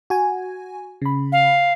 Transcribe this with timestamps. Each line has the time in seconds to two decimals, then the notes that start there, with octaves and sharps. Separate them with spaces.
0.10 F#4 G#5
1.02 C#3 B5
1.32 F5